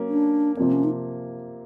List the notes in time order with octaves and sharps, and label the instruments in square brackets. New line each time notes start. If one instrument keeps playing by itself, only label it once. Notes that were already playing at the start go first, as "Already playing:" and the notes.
Already playing: [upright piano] F#3 A#3 C#4
[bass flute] D4
[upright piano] C3 F3 A#3 [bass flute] C4
[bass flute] C#4
D#4